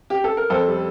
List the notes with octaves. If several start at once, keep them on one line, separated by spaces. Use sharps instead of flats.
G4
A4
A#4
F2 A4 C5
G3